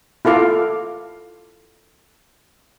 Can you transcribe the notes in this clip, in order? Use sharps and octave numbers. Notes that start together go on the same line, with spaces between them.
E4 F4 A4 F5 D6